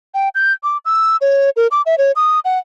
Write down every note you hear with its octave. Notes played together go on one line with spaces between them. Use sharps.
G5
G6
D6
E6
C#5
A#4
D6
E5
C#5
D#6
F#5